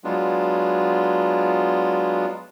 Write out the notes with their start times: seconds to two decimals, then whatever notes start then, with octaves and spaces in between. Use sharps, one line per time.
0.04 F#3 G#3 B3 D4 F4